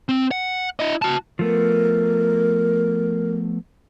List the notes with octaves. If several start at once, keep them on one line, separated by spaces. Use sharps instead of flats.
C4
F#5
E4 D#5
F#4 A5
F3 A3 B3 A#4